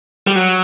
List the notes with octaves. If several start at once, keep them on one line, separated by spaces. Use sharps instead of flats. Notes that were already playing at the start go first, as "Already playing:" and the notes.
G3
F#3